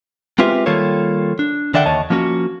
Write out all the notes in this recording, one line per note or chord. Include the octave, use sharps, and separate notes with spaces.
G#3 C4 F4 G4 B4 E5
D#3 G3 A#3 F4 A4 C#5
D4
D3 D#3 D5 E5 F#5 G5
D#2 C#5 D#5 A5
F3 A#3 C#4 F#4